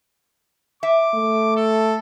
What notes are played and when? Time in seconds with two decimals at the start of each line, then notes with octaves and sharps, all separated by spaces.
0.83 E5 D6
1.15 A3
1.56 A4